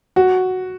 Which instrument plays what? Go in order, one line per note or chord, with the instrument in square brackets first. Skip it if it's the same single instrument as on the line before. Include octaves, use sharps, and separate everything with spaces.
[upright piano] F#4